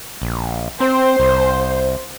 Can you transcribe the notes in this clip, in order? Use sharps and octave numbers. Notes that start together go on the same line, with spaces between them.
A#1
C4 C5
C2